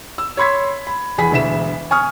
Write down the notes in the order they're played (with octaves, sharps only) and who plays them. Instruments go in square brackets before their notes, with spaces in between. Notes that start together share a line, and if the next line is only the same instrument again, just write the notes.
[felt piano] E6
C#5 B5 C6 G#6 B6
B5
E2 G#4 B5 B6
E1 D2 E5 B6 E7
G#5 C#6 D#6 F6